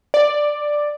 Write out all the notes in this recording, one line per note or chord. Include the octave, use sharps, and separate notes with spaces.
D5